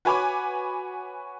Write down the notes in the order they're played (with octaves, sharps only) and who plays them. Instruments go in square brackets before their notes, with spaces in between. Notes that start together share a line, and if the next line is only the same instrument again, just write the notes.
[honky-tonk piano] F#4 B4 C#5 G#5 B5 D6